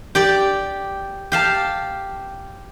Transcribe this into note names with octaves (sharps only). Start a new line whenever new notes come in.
G4 D5
G4 F5 A5